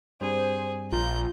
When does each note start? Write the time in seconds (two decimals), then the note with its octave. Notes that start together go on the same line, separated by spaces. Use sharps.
0.21 G2 G3 C4 G#4 C5
0.92 A#1 F4 A#5 G6